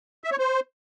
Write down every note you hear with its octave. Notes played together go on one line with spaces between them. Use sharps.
E5
C#5
C5